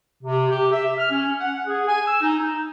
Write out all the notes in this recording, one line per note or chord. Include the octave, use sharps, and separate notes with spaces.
C3
G4
E5
F6
C#4
F#5
G#4
G#5
E6
D#4
D#4